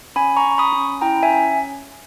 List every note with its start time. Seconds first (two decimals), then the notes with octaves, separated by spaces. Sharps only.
0.16 C#4 G#5 B5
0.37 A#5 C#6
0.44 C#4
0.52 C#6
0.58 B5 D#6
0.72 C#4
1.01 E4 G5 A#5
1.23 E5 G#5
1.30 C#4